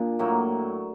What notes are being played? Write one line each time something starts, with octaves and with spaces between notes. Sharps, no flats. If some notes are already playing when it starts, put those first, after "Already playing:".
Already playing: A#2 D4 G#4
A2 F#3 A#3